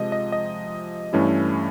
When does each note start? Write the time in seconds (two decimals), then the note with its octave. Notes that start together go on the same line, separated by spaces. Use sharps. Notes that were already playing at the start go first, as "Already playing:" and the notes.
Already playing: C3 F3 G#3 D#5
0.12 D#5
0.32 D#5
1.13 G2 E3 A3 C#4 E4